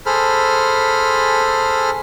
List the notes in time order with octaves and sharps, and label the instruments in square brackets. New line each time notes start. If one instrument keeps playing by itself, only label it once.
[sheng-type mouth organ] G#4 A4 C5 B5 F6